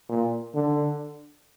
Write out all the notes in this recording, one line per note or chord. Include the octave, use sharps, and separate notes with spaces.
A#2
D3